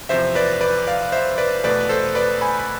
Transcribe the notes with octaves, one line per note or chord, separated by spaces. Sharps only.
E2 C3 F3 C5 E5
B4 D5
B4 D5
D5 F5
C5 E5
B4 D5
E2 B2 A3 B4 D5
A4 C5
B4 D5
G#5 B5
B5